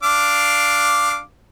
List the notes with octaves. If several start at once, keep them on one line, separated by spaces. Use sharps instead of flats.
D4 F5 D6